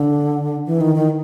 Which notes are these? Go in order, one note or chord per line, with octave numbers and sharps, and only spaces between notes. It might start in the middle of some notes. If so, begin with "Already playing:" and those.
Already playing: D3
E3
D#3
D#3